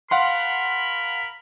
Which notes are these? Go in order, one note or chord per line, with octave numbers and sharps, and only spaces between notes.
A#4 F5 F#5 B5 C6